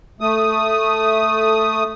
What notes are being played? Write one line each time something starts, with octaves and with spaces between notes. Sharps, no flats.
A3 D#6